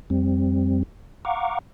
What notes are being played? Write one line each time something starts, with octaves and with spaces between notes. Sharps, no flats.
F2 G3 C4
F5 F#5 A#5 C#6 D6